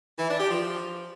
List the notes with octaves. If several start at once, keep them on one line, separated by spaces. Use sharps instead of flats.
E3
D4
G4
F3